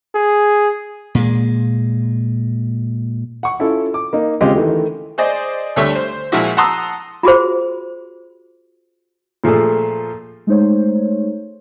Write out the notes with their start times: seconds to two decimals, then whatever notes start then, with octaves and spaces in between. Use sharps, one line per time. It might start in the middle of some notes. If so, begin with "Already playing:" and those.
0.15 G#4
1.15 A#2 G#3
3.43 F#5 C#6
3.60 C#4 E4 F4 A4
3.94 D6
4.13 A#3 D#4
4.41 C#3 G#3 C4 C#4 F4 G4
4.55 D#3 E3 A3
5.18 G#4 C5 D5 D#5
5.76 D2 G3 A3 C#5 E5
5.95 C5
6.32 A#2 F3 G#3 E4 F#4
6.57 F#5 A5 A#5 C6 D#6 E6
7.23 F4 F#4 G#4 C5
9.44 A#2 F3 A3 G#4 A4
10.47 G#3 A3 D#4 C5 C#5